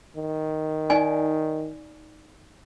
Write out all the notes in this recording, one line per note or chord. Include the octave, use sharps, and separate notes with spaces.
D#3
D#4 D5 G#5